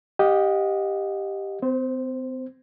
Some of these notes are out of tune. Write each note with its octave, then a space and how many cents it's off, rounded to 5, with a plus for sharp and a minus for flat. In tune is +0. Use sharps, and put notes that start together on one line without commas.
G4 +0 D#5 +0 F#5 -45
C4 -40 C5 +0